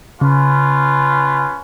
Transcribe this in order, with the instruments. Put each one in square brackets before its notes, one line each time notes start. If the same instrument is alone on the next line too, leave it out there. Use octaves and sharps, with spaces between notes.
[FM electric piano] C#3 [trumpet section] C#4 F4 B4